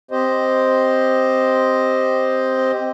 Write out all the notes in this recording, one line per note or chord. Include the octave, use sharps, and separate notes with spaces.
C4 G4 C5 D#5